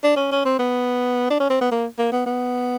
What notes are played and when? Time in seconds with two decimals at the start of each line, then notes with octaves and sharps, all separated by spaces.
0.04 D4
0.17 C#4
0.32 C#4
0.45 C4
0.59 B3
1.30 D4
1.40 C#4
1.50 C4
1.61 B3
1.71 A#3
1.99 A#3
2.13 B3
2.26 B3